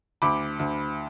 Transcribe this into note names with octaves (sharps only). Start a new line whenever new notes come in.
D2 B5 D6
D2